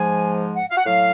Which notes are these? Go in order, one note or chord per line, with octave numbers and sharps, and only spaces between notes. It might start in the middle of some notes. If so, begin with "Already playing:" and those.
Already playing: G#2 F3 G#3 G#5
F#5
F5
F#5
A2 F#3 F5